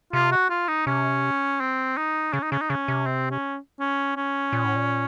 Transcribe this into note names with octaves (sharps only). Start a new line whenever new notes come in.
C3 F4
F#4
F4
D#4
C3 C#4
C4
D#4
C#3 C#4
D#4
C#3 C#4
D#4
C#3 C#4
C3
C4
C#4
C#4
C#4
A#2
A2
A#2